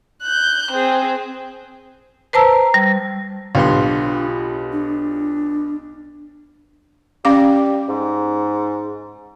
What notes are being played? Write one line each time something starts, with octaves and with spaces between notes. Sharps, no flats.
F#6 G6
C4 G#4
B4 C5 A5 A#5 E6
G3
B1 B3 D4 F4 G4 C6
D4
G3 C#4 F5 D6
G#2